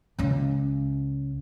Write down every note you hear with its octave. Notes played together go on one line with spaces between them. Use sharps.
C#2 C#4